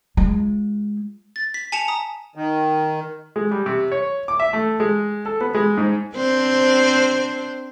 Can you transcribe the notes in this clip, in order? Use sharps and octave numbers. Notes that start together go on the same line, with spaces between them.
G#3 F4
A6
B6
G#5 A5 B6 C#7 E7 F7
A#5 D#6
D#3
G#3
G3
C3
C#5
D6
E5
A3
G#3
A4
B3
G#3
G#2
C4 D4 C5